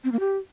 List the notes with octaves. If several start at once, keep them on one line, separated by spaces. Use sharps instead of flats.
C4
A#3
G4